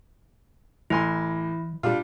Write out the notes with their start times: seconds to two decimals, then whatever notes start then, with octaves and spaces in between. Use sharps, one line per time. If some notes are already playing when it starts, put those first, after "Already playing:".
0.90 A1 E3 E4 G#5 C6
1.83 A#2 G3 D4 F4